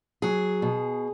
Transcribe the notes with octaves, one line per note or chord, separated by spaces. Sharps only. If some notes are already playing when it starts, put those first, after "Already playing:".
F#3 G#4
B2